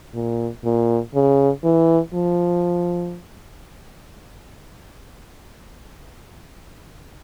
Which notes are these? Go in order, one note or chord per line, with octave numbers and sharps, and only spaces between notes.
A#2
A#2
C#3
E3
F3